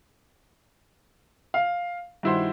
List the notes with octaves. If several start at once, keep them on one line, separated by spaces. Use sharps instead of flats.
F5
G2 D#3 E4 F#4 C5